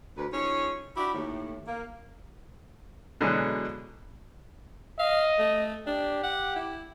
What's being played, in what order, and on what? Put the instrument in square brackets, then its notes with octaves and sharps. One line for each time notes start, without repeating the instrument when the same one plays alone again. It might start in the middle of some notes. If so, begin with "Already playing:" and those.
[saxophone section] D2 B4
F3 C#4 D#4 E4 G#4 C#5
D4 E4 F#4 G4
D#2 A2
A#3
[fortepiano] B2 D3 E3 F#3 G#3
[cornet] D#5 [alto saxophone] F5
[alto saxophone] A3
[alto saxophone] D4 [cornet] G4
[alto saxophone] F#5
E4